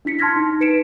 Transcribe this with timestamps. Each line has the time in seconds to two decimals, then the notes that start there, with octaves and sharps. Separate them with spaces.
0.05 D4 E4 B6 C#7
0.19 A5 C6 F6 G#6 A#6 B6
0.36 D#4
0.60 D#4 B4 C#7 D7 E7